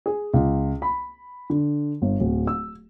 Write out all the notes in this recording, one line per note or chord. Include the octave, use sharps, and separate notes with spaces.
G#4
C#2
B5
D3
G1
D1
E6